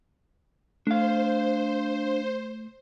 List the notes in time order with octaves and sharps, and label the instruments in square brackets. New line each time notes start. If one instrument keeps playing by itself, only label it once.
[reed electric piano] A3 [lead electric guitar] D4 F5 [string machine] C5